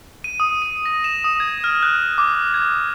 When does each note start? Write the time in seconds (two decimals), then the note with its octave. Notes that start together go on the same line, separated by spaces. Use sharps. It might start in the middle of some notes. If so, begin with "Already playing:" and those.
0.24 D#7
0.40 D#6
0.62 D#7
0.86 A#6
1.04 E7
1.24 D#6
1.40 G#6
1.64 F6
1.83 F#6
2.18 D6
2.54 G#6